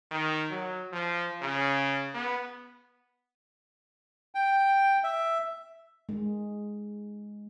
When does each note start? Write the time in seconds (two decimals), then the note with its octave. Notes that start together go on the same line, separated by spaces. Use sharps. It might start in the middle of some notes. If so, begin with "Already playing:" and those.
0.11 D#3
0.51 F#3
0.93 F3
1.42 C#3
2.14 B3
4.35 G5
5.04 E5
6.09 G#3